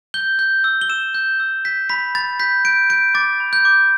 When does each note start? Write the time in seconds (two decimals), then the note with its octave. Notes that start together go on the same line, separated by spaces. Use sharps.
0.14 G6 G7
0.39 G6
0.64 E6
0.81 G7
0.89 E6 E7
1.15 G6
1.40 E6
1.65 G6 B6
1.89 B5 B6
2.15 B5 A6
2.40 G6 B6
2.65 G6 D7
2.90 G6 D7
3.15 D6 A6
3.40 B5
3.53 G6
3.65 D6